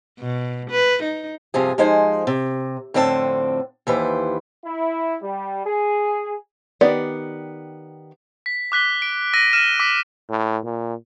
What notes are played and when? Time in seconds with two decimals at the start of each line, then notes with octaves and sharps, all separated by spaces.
0.19 B2
0.71 B4
1.03 D#4
1.54 G2 C3 F3 G#4
1.78 F3 G#3 D#4 C5 G#5
2.27 C3
2.94 F2 A2 D3 C4 F#4 A5
3.87 D#2 E3 B4 C5
4.65 E4
5.22 G3
5.65 G#4
6.81 D#3 B3 G4 D5
8.46 B6
8.72 D6 F#6 B6 G7
9.02 D7
9.34 E6 A#6 D#7
9.53 F6 B6 D#7 E7
9.80 D6 E6 B6
10.30 A2
10.65 A#2